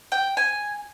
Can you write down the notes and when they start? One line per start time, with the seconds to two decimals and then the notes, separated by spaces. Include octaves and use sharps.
0.12 G5
0.37 G#5